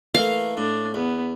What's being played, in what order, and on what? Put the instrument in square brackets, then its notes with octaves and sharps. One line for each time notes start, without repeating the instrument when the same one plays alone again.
[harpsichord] E3 A3 A#3 [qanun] F5
[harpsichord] A2 [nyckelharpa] D4
[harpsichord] E2 [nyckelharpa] B3